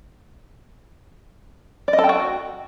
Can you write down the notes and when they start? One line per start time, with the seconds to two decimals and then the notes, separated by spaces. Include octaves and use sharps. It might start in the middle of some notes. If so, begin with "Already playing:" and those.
1.88 D5
1.93 D#5
1.98 A4
2.04 G5
2.09 F#4